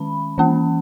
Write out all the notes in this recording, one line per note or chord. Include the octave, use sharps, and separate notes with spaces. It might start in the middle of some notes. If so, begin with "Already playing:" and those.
Already playing: D#3 G#3 C#4 B5
E3 A#3 C#4